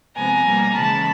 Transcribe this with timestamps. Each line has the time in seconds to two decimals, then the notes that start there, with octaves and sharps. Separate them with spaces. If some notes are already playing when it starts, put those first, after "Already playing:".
0.16 C3 F3 G#3 B3 G#5 A#5
0.46 B2 G3 A#3
0.75 C#3 E3 G#3 A5 B5